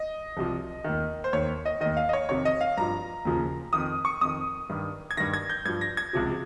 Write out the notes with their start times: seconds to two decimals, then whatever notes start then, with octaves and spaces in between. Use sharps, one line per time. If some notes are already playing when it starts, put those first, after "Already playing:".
Already playing: D#5
0.37 C2 C3 F3
0.84 D#2 D#3
1.24 C5
1.33 D#2 D#3 C#5
1.65 D#5
1.81 D#2 D#3 D#5
1.97 F5
2.09 D#5
2.13 C#5
2.29 F2 C3 D#3 C#5
2.45 D#5
2.61 F5
2.77 G2 F3 A#5
3.25 D#2 C#3 F3
3.73 F2 D#3 D#6
4.05 C#6
4.21 F2 D#3 D#6
4.69 G2 D#3
5.11 G#6
5.17 G2 D#3 A#6
5.34 G#6
5.50 G6
5.65 G2 F3 G#6
5.81 A#6
5.97 G#6
6.13 C#2 C3 F3